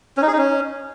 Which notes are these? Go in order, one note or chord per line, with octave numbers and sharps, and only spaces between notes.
C#4
D#4
G#4
D#4
C#4